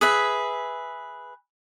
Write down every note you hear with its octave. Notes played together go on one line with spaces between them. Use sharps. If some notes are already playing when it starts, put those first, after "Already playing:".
G#4 B4 E5